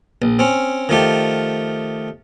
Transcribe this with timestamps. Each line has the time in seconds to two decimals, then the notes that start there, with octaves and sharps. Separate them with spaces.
0.22 A#1
0.39 C4 C#4
0.89 D#3 F3 A3 G4